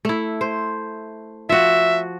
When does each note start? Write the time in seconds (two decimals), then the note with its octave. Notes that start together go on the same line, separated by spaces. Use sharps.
0.05 A3 E4
0.41 C5
1.49 F3 F#4 E5